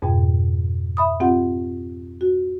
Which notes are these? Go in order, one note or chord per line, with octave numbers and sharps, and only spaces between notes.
F2 G#2 B2 G5
E5 B5 D#6
C4 F4 G4 F#5
F#4